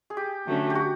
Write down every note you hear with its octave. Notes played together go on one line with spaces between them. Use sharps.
G#4
G4
D3 F#3 A3 C#4
G4
F#4